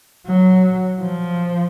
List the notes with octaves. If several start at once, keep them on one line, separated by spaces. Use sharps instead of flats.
F#3
F3